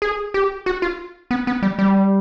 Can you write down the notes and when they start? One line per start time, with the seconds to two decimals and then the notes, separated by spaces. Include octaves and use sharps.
0.02 G#4
0.34 G4
0.66 F#4
0.82 F4
1.31 B3
1.47 B3
1.63 G3
1.79 G3